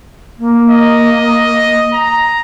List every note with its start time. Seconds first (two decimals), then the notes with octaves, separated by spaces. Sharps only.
0.38 A#3
0.70 D#5
1.94 A#5